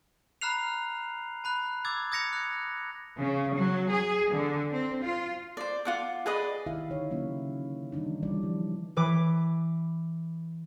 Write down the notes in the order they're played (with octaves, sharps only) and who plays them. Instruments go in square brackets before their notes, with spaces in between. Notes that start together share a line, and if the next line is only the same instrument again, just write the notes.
[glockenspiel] A#5 B5 F6 F#6 C7 F7
A5 B5 F#6
D6 E6 G#6 A6
D#6 G#6 A#6 C#7 F7
F#6
[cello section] C#3
F#3
G#4
D3
C4
F4
[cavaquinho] C5 D5
F4 F#5 D6
G#4 B4 D5 D#5
[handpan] D#3 E4 G4 E5 F5
D3 D#4 C#5
C#3 F#3 A#3 C#4 E4
D#3 E3 G3 D4 D#4
D3 E3 F#3 G3 D5
F3
[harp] E3 B4 D6